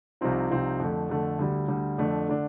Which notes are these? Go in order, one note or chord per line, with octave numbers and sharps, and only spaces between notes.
C2 C3 F3 C4 D#4
C2 C3 F3 C4 D#4
F2 D3 A3
F2 D3 A3
D2 D3 G3
D2 D3 G3
F2 D3 A3 D4
D3 A3 D4